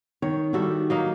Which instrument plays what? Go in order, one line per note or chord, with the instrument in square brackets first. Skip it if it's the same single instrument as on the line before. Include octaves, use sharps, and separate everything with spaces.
[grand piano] D#3 [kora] C#5
[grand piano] D#3 G3 [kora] E4 F#4 A4
[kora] F#3 A#3 D#4